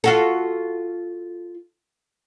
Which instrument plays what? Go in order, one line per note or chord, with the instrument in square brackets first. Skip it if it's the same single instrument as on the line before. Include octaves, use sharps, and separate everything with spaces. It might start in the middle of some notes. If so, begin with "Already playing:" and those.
[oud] F4 F#4 A4